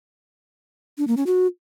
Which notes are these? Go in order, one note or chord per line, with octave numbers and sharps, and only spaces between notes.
D4
A#3
C#4
F#4